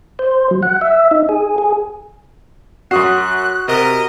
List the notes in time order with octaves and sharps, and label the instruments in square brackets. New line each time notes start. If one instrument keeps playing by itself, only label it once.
[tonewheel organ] C5
F#3
F#5
E5
D#4
G#4
G#4
[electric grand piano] F#2 D#6 C7 [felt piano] F#4 [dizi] F#6
[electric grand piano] C3 [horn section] A#4 D#5